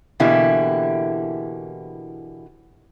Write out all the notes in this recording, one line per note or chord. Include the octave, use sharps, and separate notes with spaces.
B2 D3 E3 A#3 E4 G4